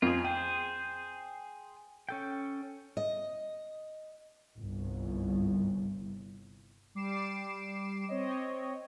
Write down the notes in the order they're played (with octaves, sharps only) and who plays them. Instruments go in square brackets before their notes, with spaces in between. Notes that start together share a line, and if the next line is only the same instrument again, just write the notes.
[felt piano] F2 [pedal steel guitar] F4 G#4
[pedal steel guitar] G#4 C5 [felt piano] G5
[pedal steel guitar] C#4 A4 G5
[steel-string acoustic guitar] D#5
[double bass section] G1 C2
[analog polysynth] G3 D6 C7 D7 E7
C4 C#5 D#5